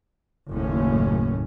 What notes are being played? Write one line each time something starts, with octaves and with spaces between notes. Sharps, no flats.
F#1 D#2 A2 C#4